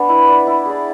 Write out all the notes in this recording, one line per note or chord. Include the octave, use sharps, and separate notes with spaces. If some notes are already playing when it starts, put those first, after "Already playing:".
Already playing: B3 D4
E4
B4 D5
E4
G#4 D5